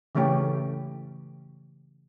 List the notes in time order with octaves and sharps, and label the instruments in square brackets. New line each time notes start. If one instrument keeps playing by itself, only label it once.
[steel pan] C#3 E3 A3 C#4 G4